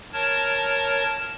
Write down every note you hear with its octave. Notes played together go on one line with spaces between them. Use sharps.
A#4 C#5 A5